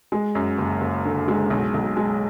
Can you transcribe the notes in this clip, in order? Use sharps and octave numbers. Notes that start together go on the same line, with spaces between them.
G#3
F#2
F#1
F#1
D3
G#3
B1
B1
G#3